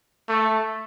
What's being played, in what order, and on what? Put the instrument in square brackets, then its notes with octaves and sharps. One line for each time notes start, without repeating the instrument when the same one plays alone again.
[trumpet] A3